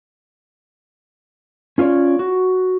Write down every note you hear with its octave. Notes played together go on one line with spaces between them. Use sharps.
C#4 F4 G#4 C#5 D5
F#4